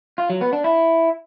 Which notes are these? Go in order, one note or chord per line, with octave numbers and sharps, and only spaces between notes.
F4
F#3
B3
D4
E4